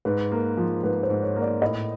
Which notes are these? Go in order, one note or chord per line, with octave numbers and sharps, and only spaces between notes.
G#2 B4
A#3
F3
G#2 B4
C5
G#2
C#5
A#3
D5
A2 D#5